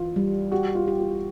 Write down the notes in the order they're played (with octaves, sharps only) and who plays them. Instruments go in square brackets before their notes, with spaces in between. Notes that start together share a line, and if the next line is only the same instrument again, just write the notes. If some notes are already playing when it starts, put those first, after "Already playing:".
Already playing: [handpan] E3 [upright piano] F4
[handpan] G3
[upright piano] F#4 [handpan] G4
[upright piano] F4
[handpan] G4
[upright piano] F4